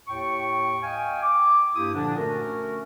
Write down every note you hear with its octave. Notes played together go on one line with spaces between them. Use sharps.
D#2 A2 G5 C#6
D#5 F5 G5 G#5
D6
G2 A#3 E4 G4 D#6
A#2 D3 F3 D4
A3 C#4 F#4 A#4